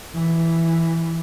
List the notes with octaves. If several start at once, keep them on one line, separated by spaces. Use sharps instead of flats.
E3